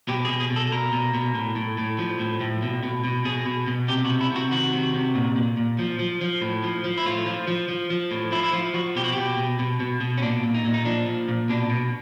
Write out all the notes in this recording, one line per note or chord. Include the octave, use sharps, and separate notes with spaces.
B2 G4
G#4
B2
G#4
B2
A4
B2 A#4
B2
B2
A2
A2
A2
F3
A2
A2
B2
B2
B2
B2 G#4
B2
B2
C3 G4
F#4
C3
E4
C3 F#4
D#3 F#4
C3
C3
A#2
A#2
A#2
F3
F3
F3
A2
F3
F3
E4
A2 F4
F3
F3
F3
F3
A2
F3 E4
E4
F3 F4
F3 F#4
B2 G4
F#4
B2 G4
B2
B2
B2
B2
C#4
A#2 D4
A#2
D#4
A#2
D#4
F3 D4
A#2
A#2
B2 D4
B2